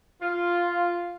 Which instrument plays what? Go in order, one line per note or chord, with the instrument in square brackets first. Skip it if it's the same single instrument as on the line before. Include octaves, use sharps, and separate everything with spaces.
[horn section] F4